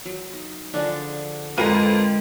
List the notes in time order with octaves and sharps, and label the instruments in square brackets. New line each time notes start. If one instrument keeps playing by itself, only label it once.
[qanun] F#3
D#4
[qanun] D3 F3 G#4 [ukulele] D4 D5
[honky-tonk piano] F2 F4 D#7 [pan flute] G#3 [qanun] A#4 [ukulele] B4 A#5